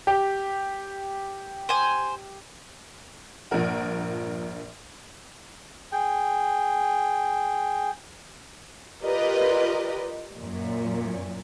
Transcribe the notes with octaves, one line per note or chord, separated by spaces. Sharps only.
G4
C5 G#5
A#1 G2 F3 A#3 A#4 F#5
G#4 G5
F4 G4 A#4 B4 D5 D#5
F#2 A#2